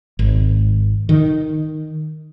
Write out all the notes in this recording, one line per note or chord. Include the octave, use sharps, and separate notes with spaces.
G#1
D#3